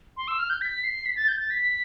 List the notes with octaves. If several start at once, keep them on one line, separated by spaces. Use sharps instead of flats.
C6
E6
F6
G6
B6
C7
B6
A6
G6
A6
B6